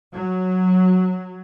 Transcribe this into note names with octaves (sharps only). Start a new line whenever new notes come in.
F#3